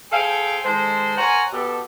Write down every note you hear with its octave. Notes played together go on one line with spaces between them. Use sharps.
G#4 A4 C5 F5 G5 G#5
D#3 G#3 A4 C5
A#4 C5 C#5 F#5 G#5 A#5
B2 G4 A4